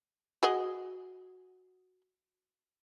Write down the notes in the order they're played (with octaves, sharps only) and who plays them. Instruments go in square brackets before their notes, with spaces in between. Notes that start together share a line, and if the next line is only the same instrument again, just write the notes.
[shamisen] F#4 G#4 D#5